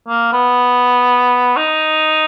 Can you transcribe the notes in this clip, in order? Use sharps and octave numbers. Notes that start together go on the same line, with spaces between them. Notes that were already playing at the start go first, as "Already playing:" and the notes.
A#3
B3
D#4